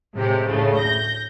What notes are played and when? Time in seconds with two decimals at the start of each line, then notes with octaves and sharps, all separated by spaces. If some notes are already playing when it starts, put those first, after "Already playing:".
0.17 A2 C3 G#3 G4
0.46 D2 A2 C#3 A3
0.76 G6 A#6